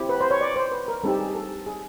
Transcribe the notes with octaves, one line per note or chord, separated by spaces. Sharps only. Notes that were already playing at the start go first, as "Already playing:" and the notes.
Already playing: C4 E4 G4
B4
C5
C#5
D5
C5
B4
A#4
G3 C4 D#4 G4 A4
G#4
A4
G#4